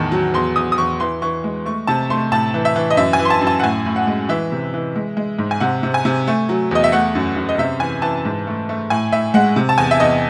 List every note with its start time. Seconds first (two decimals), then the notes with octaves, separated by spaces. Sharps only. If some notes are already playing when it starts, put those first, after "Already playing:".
Already playing: E2 A2 D#3 A5
0.12 F#3
0.34 E2 C6
0.56 E2 D#6
0.72 D#6
0.78 E2 C#6
1.00 E3 C6
1.22 E3 C#6
1.44 G#3
1.65 A3 C#6
1.87 C3 A5
2.10 A3 C6
2.32 A2 A5
2.54 E3
2.65 E5
2.76 E3
2.90 D#5
2.97 F#2 E5
3.13 G#5
3.19 E3
3.25 C6
3.30 A5
3.41 F#2
3.47 A5
3.60 F#5
3.63 A2 G#5
3.86 A2
3.96 F#5
4.07 G#3
4.29 E3 E5
4.52 C3
4.74 E3
4.96 G#3
5.17 G#3
5.39 G#2
5.51 G#5
5.60 C3 F#5
5.83 C3
5.94 G#5
6.05 C3
6.27 A3
6.49 F#3
6.71 E2 D#5
6.84 E5
6.92 A3 F#5
7.15 F#2
7.36 F#2
7.49 D#5
7.58 C3 E5
7.80 E3 G#5
8.02 E3 A5
8.25 G#2
8.47 A3
8.69 A3
8.90 A2 G#5
9.12 A2 E5
9.34 G#3 F#5
9.56 C3
9.69 A5
9.78 E2 G#5
9.91 E5
10.00 E2 D#5